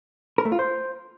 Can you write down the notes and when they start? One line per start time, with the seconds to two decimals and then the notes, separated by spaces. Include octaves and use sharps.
0.38 A#4
0.45 A3
0.52 F4
0.59 C5